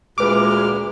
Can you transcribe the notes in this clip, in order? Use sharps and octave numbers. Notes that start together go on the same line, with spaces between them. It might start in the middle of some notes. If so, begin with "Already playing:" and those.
D2 A#2 G#3 B4 D6 F6